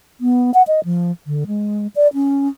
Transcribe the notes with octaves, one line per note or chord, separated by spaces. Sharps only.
B3
F#5
D#5
F3
D3
G#3
D5
C#4